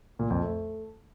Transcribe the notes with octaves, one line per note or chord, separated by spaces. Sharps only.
A#2
F2
A3